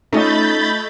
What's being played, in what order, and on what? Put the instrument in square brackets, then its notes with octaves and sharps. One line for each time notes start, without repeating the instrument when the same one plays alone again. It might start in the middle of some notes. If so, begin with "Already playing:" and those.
[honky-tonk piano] A3 F4 D#5 [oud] C#4 D#4 [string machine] B5 G6 A6